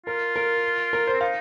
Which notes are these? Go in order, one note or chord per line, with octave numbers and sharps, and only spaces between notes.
F4 A#4
A#4
A#4
C5
C4
D#4 F5